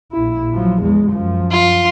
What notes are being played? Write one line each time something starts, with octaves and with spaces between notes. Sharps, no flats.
A#1 E4
F3 F#3
E2 G#3
F#2 F3
F4